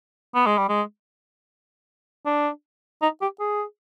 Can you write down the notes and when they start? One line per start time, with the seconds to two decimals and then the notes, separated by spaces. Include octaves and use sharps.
0.35 B3
0.46 G#3
0.58 G3
0.69 G#3
2.26 D4
3.02 D#4
3.21 G4
3.40 G#4